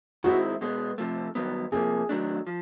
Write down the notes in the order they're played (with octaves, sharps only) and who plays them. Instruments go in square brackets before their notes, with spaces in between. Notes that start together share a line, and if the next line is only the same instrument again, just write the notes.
[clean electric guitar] D#3 G#3 C4 E4 [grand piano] F#4
[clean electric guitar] B2 G#3 B3
C3 F3 A3
G2 D#3 F#3 B3
[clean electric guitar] C3 F3 A#3 [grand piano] G#4
[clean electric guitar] D#3 F#3 A3 D4
F3